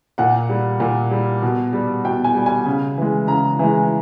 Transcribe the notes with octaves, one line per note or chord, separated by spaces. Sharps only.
A#2 F#5
G3
A#2
G3
B2
G3
B2 G5
G#5
G3
G#5
C#3
E3 G#3
C#3 A#5
E3 G#3